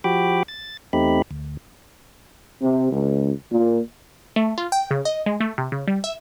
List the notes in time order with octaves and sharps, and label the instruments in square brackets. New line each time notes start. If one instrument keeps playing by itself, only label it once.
[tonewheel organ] F3 F#4 G4 G5 B5 D6
A6
E2 A3 C4 D#4 G4 B5
D2
[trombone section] C3
C#2
A#2
[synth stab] A3
F4
G5
C#3
D#5
G#3
A3
C3
C#3
G3
E5